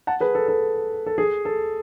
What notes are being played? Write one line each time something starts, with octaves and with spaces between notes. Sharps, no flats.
F#5 A5
G#4 B4
A4
A4
A4
G#4
A4